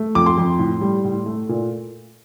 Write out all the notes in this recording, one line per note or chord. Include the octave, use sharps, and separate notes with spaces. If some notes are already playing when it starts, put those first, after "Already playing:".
Already playing: A3
F2 D6
C6
F2
A2
G3
A2
A3
A#2